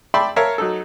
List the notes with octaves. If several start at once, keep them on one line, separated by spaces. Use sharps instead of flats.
D5 E5 G5 A5 B5 C6
A#4 C#5 E5 F5 A5
F#3 D#4 A4